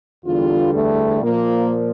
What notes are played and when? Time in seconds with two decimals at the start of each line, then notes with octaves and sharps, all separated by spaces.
0.24 E2 D3 G3 F4
0.73 A3
1.22 A#2 F3 A#3